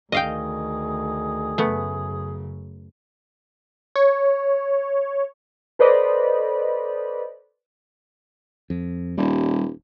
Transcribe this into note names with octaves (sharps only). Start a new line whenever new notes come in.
D2 D#3 G#4 D#5 F5 G5
F#2 C#3 A3 B3
C#5
A4 B4 C5 D5 D#5 B5
F2
D#1 G3